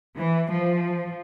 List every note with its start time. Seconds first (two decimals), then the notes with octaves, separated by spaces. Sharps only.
0.18 E3
0.52 F3